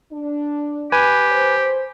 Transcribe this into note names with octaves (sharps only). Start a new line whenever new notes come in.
D4
G4 B4 G#5
C5